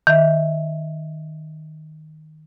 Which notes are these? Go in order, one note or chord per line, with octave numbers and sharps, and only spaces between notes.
D#3 E5